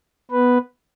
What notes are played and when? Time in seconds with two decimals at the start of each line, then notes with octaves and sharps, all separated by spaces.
0.31 B3 B4